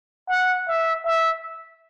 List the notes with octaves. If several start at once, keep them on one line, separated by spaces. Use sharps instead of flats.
F#5
E5
E5